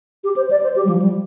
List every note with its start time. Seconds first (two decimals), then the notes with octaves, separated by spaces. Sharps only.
0.24 G4
0.36 C5
0.50 D5
0.63 C5
0.76 G4
0.85 G3
0.89 F3
1.02 G3